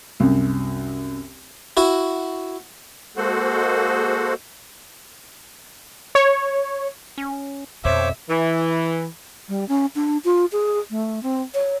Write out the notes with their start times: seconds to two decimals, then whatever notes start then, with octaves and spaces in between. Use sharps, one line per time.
0.20 C2 F#2
1.77 E4 F#4
3.17 G#3 A#3 F#4 A4 C5 F#5
6.15 C#5
7.18 C#4
7.85 F2 B2 C5 C#5 E5 D6
8.30 E3
9.49 G3
9.69 C#4
9.95 D4
10.25 F4
10.52 G#4
10.90 A3
11.23 C4
11.54 C#5